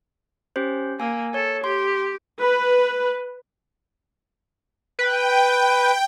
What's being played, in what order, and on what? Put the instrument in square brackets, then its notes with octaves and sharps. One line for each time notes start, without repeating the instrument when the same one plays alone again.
[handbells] C#4 G4 C5
[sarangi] A#3 [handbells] G#5 E6
[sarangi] A4 [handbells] C#5
[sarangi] G4 [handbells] C6
[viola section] B4
[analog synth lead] B4 [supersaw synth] G5